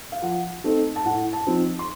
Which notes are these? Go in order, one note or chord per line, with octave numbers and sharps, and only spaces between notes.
F5
F3 F#5
A3 C4 D#4
A5
A2 F#5
A5
F3 C4 D#4
C6